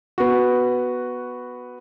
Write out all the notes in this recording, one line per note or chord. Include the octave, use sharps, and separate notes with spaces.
B3 F#4